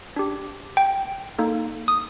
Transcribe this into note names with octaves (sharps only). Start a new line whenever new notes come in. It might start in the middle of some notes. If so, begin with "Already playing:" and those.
D4 G4
G5
A#3 D#4 A4
D#6